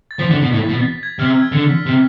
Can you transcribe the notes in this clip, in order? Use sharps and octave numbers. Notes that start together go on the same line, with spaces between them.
A6
F3 B6
D3
B2
A2
B2
G#6
C3 F6
E6
G#6
D3
B6
C3